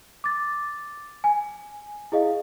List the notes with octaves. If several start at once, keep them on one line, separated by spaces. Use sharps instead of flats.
D6 A6
G#5
E4 G#4 D#5 F5